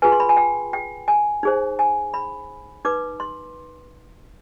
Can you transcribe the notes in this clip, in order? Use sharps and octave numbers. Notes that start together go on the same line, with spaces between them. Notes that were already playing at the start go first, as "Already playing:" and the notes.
F4 G#4 B4 G#5
C6
B5
G#5
G5
G5
G#5
D#4 G#4 C5
G#5
B5
D#4 B4 D6
C6